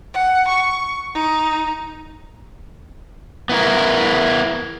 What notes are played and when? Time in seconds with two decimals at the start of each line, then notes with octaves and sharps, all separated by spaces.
0.13 F#5
0.48 C#6
1.14 D#4
3.49 B3 E4 A#4